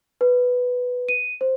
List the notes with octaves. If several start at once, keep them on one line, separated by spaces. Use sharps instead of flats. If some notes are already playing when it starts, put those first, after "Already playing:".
B4
D#7
C5